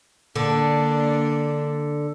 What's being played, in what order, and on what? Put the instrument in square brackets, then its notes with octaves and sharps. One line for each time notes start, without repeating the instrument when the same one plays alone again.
[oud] D3 [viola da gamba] A#3 D4